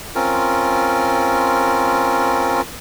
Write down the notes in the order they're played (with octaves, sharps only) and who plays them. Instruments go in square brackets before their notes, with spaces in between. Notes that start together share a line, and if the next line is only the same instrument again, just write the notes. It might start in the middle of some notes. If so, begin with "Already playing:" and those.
[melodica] C4 C#4 F4 A#4